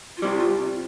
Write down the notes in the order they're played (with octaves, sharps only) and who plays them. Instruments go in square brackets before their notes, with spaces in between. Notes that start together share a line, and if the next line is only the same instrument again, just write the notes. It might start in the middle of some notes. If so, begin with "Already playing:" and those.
[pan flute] F4
[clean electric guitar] C2 C3 G3 [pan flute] E4
[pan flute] F4